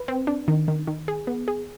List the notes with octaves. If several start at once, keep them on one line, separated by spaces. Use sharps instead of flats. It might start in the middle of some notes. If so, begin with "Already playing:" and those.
Already playing: B4
C4
D4
D#3
D#3
D#3
G#4
B3
G#4